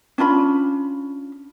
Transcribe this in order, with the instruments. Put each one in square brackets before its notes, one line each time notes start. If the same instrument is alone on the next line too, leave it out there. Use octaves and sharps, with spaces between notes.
[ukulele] C#4 D4 F4 B5